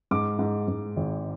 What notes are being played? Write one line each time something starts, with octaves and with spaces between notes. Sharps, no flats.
G#2 D6
G#2
G#2
G#1